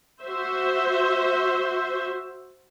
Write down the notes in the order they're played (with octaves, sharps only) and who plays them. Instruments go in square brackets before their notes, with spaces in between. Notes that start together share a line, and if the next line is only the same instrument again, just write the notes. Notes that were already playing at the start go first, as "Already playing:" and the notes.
[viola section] F#4 C5 E5